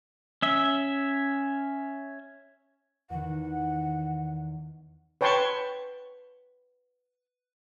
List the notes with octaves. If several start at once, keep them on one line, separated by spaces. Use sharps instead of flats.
C#4 E5
E2 D#3 F#5
B4 C#5 G5 A5 C6 C#6